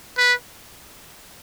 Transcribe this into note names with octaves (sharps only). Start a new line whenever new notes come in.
B4